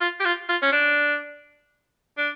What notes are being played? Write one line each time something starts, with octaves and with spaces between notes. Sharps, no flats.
F4
G4
F4
F4
C#4
D4
D4